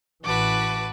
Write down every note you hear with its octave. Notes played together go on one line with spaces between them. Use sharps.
A1 E3 F#4 B4 A5 D6